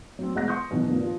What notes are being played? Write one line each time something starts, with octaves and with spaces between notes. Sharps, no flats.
F#3 C4
E1 G#3 D#5 F#5 F#6 A#6
C6 C#6 D#6 F#6 G6
E2 B2 D#3 F#3
G2 A#2 D#3
F3